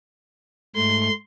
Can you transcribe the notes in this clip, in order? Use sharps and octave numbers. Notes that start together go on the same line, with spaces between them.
G#2 A3 C6